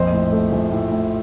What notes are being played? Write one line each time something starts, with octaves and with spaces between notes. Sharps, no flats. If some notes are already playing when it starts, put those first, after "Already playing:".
Already playing: A#1 F2 C5 D#5
A2
A3
A#1
A2
A2